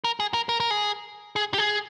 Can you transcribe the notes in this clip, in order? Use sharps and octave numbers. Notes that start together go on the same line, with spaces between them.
A#4
G#4
A#4
A#4
A#4
G#4
G#4
G4
G#4